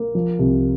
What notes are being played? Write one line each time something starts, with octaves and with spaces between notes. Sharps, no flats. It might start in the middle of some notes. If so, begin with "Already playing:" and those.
Already playing: A#3
F3
C2